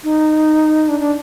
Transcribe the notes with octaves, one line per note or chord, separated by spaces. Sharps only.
D#4
D4
D4